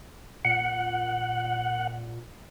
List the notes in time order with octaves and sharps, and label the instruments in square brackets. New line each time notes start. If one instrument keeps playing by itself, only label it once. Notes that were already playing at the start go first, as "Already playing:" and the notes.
[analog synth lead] A#2 [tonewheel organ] F#5